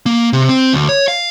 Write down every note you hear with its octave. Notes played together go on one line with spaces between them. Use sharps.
A#3
C3
C4
D2
C#5
F5